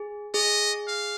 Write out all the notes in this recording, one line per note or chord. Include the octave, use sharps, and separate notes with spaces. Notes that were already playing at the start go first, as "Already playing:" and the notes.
Already playing: G#4
G#4 D#5
F5